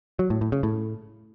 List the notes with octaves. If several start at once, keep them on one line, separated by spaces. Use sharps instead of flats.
F#3
A2
A2
C#3
A2